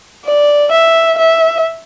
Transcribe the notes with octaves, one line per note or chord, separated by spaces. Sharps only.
D5
E5
E5